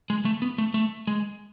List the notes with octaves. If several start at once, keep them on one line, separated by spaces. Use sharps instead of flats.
G#3
A3
B3
A3
A3
G#3